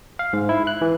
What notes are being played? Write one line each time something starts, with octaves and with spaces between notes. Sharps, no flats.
F5
G#2
E4
F#6
E3